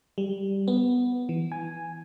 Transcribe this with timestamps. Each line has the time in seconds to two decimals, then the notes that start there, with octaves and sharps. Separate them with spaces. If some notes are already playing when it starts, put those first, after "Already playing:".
0.18 G3
0.68 B3
1.29 E3
1.52 G#5